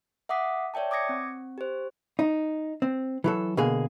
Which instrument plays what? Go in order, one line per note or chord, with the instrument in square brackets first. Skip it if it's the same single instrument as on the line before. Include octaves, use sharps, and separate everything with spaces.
[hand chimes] E5 F#5 D6 D#6 B6
C#5 D5 E5 G5 A5
D6 D#6 G#6 A#6 C#7
C4
G4 C5
[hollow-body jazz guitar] D#4
C4
E3 F#3 A4
B2 D3 A#3 G#4